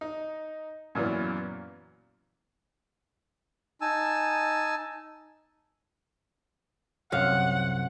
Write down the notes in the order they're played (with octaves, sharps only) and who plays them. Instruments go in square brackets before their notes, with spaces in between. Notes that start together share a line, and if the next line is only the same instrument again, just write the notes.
[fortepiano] D#4
F#2 A#2 E3 F#3 B3
[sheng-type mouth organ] D#4 G#5 A5 E6
[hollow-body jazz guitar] C2 F#2 F5 [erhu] F#5